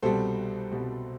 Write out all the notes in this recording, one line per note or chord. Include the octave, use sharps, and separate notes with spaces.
C2 B2 G3 A4 C5
C2 B2 G3